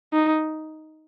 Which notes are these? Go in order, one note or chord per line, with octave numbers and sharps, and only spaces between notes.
D#4